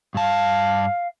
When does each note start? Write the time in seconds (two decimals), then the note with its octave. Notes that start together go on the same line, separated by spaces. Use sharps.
0.14 G2 F5 A5